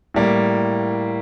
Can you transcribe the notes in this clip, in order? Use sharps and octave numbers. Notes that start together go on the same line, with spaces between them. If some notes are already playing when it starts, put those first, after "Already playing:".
A2 G3 A#3